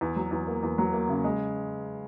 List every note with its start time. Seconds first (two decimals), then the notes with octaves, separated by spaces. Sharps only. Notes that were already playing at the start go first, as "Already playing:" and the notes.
0.01 E2
0.16 F#3
0.31 E2
0.47 A#3
0.63 E2
0.78 F#3
0.93 A#3
1.09 C#3
1.24 G#3